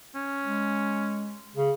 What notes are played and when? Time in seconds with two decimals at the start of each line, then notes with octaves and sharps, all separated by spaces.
0.15 C#4
0.44 G#3
1.56 C#3